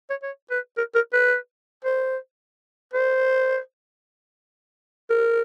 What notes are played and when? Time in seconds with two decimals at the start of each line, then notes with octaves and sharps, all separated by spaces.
0.10 C#5
0.23 C#5
0.50 B4
0.77 A#4
0.95 A#4
1.13 B4
1.84 C5
2.94 C5
5.10 A#4